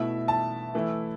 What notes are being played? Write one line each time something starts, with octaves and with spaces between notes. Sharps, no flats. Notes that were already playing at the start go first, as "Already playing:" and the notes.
Already playing: B2 A3 E4 E5
A5
E3 A3 E4